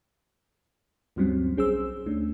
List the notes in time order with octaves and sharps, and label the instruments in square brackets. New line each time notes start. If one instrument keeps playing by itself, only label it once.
[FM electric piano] D2 G2 F#3 G3 C4 C#4
B1 C#4 G#4 C5 E6
D2 A3 C#4 D4